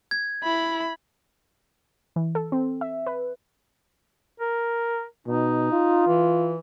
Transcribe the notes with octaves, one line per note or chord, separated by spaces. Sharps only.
G#6
E4 B5
E3
A4
C4
E5
B4
A#4
B2 D#4
F4
E3